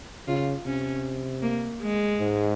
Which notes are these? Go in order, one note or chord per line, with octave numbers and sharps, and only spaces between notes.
C#3 F4
C3 C#4
A#3
G#3
G#2